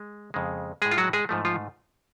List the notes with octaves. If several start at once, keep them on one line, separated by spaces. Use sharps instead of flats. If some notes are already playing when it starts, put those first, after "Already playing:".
Already playing: G#3
F2 C#3 G#3
A2 G#3 G#4
F4
F#3 F#4
G#3 G#4
G#2 F3 A3
F3 F4